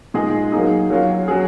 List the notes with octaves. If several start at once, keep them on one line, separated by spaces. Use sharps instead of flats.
A#2 G#3 D#4 G#4 D#5
F#3 A#3 D#4 G#4
F#3 A#3 C#4 F4
F#3 C#4 G#4